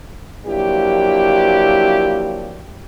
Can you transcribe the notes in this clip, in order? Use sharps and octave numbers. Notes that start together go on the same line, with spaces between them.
F3 F#3 A#3 D4 E4 G4